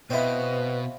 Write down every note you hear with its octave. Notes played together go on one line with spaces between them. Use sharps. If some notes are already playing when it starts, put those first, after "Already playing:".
B2 C4 E4 B4 C5 D#5 F5